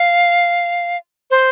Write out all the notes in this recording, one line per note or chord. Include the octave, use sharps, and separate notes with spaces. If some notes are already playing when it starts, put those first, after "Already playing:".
Already playing: F5
C5